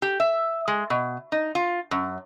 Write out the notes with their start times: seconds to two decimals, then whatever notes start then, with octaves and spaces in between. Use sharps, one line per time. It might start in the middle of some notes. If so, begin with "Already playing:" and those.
0.02 G4
0.20 E5
0.68 G#3
0.90 B2
1.32 D#4
1.55 F4
1.91 F#2